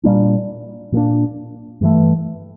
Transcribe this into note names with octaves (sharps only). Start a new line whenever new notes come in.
A#2 G3 A#3 D4
A#2 G3 A#3 D4
G2 E3 A3